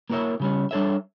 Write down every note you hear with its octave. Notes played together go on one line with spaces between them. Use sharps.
A#3 E4 A#4 C#5 E5
C#3 G3 C#4
G3 D4 A4 C#5 E5